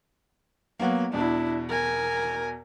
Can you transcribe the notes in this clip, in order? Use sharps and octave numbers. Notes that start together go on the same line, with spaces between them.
F#3 A#3 B3
E2 B2 D4 E4
A#4 G#5